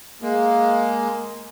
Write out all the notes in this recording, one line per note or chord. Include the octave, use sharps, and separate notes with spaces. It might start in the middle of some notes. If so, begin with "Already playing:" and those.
G#3 A#3